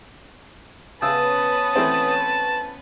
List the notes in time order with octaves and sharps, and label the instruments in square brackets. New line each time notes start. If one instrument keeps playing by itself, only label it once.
[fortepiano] C#3 E6 [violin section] B3 C#4 B4 [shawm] A5 [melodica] D#6
[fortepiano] E3 A3 C4